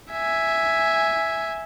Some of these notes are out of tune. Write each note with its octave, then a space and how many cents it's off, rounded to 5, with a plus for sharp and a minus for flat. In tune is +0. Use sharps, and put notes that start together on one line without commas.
E5 +0 G#5 +0